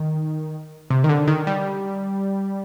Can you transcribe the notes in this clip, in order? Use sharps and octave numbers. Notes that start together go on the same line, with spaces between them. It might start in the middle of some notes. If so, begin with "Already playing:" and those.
Already playing: D#3
C3
D#3
D3
D#3
G3